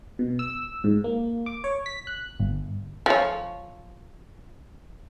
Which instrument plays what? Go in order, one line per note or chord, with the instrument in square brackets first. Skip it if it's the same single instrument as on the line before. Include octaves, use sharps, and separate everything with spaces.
[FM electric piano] B2
E6
G#2
A#3
D6
C#5
B6
F#6
G1
[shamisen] F3 C#5